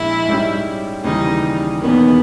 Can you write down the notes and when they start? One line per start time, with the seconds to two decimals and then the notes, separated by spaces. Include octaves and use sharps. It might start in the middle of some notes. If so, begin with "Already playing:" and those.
Already playing: A#1 A#2 G#3 E4
0.28 G#2 G3 C#4 G4
1.04 D#2 C#3 E3 G3 D#4
1.81 E1 E2 D#3 A#3 B3 C#4